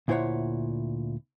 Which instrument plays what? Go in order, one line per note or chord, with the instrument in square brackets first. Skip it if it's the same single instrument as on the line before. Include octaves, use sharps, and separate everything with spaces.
[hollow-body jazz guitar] D2 A#2 E4 C5 C#5 F#5